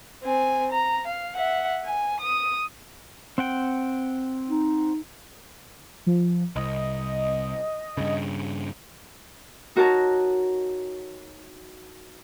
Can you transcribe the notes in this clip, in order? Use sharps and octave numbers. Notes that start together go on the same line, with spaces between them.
C4 G#5
A#5
F5
E5 F#5
G#5
D#6
C4 F#5 G5
D#4
F3
C2 D#5
G2 C#3
D#4 F#4 A#4 C#5 A5